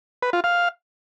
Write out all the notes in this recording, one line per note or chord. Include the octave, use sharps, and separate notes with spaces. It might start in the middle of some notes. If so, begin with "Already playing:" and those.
B4
F4
F5